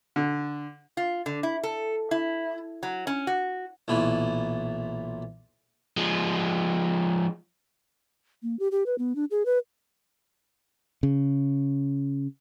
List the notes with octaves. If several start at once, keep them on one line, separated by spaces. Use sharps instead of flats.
D3
F4
D3
E4
A4
E4
F#3
C#4
F#4
B1 A#2 E3
F3 G#3
A#3
G4
G4
B4
B3
D4
G#4
B4
C#3